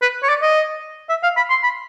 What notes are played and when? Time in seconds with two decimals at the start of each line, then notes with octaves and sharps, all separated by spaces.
0.02 B4
0.23 C#5
0.29 D5
0.42 D#5
1.09 E5
1.23 F5
1.37 B5
1.50 C6
1.63 B5